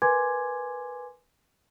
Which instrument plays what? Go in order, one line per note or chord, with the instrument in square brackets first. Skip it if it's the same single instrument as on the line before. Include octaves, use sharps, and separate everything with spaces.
[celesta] A#4 B4 G#5 C6 D6 G#6